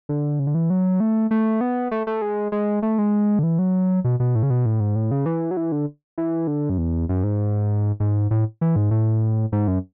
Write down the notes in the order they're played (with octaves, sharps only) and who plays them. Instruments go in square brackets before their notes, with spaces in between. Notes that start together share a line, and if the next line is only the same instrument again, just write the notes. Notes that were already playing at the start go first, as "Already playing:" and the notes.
[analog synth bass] D3
C#3
D3
E3
F#3
A3
A3
B3
A3
A3
G#3
G#3
A3
G#3
D3
E3
F#3
B2
B2
A2
C#3
B2
A2
G#2
A2
C#3
E3
F#3
E3
D3
E3
D3
F#2
E2
F#2
G#2
G#2
A2
E3
G#2
A2
G#2
F#2